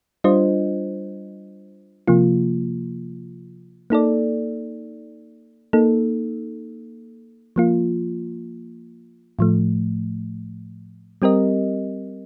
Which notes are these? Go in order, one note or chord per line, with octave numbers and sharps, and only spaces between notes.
G3 D4 F4 C5 D#5
C3 F3 A#3 F4
A#3 D#4 A4 D5
A#3 D#4 A4
F3 A#3 F4
A2 F3 A3
G3 C4 G4 A#4 D#5